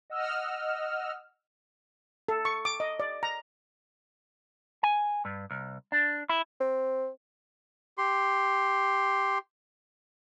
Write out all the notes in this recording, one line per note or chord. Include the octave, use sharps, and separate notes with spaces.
D#5 F#5 E6 F6
A4
C#6
D6
D#5
D5
A#5
G#5
G2
C2
D4
E4
C4
G4 C6